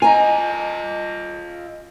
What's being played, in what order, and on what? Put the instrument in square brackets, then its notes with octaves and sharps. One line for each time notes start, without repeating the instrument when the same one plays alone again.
[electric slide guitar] F4 D#5 [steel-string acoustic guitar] G#5 A#5